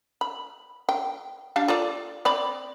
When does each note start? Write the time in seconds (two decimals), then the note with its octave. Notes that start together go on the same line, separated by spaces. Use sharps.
0.21 B5
0.89 G5
1.56 G3 D4 F5
1.68 F4 A4 D5
2.25 C4 D5 B5